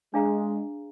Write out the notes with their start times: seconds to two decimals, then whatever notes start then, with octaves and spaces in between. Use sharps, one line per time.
0.14 G#3 D4 G#4 D5 F5 A#5